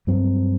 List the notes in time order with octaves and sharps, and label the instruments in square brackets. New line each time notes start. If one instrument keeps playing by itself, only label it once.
[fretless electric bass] G2 F#3 C4